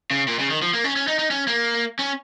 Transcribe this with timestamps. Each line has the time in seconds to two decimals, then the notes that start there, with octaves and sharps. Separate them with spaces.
0.11 C#3
0.28 A#2
0.39 C#3
0.50 D#3
0.62 F3
0.73 A#3
0.84 C#4
0.96 C#4
1.08 D#4
1.19 D#4
1.30 C#4
1.47 A#3
1.99 C#4